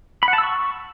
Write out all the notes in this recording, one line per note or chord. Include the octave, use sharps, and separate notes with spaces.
B5
F#5
A5
E6
C#6